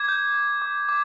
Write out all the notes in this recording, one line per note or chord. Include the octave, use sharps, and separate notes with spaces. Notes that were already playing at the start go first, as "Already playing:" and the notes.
Already playing: D6 G#6
G6
G6
D6
D6